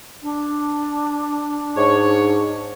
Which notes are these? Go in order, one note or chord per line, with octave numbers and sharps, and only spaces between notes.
D4
G#2 C#5